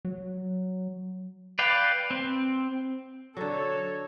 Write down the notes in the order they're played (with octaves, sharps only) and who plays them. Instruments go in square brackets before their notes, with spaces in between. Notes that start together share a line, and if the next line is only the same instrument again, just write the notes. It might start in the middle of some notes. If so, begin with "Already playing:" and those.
[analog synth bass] F#3
[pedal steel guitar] B4 D5 F5 G5
C4
[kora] D3 F#3 [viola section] A4 C#5